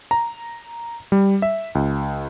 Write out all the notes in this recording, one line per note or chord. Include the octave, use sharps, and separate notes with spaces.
A#5
G3
E5
C#2